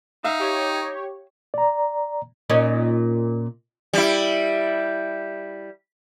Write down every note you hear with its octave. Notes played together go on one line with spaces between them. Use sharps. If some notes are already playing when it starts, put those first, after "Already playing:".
D#4 E5 F5
G4 C#5
D5 A#5
A#2 C#4 D#4
G3 E4